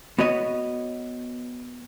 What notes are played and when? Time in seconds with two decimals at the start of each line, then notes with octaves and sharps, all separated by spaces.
0.19 B3 F#4 C#5 D#5